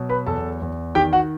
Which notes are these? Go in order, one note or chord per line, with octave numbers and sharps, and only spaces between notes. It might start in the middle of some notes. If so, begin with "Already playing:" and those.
Already playing: B2 F#3
B4 B5
E2 A4 A5
E2
D#3 G4 G5
F#4 F#5